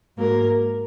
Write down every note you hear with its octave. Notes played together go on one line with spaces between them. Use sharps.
G#2 F#3 A#3 A#4